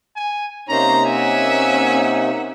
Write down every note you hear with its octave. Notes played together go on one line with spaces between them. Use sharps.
G#5
C3 A#3 C#4 D#4 C5 A#5
C#4 E5 F#5 G#5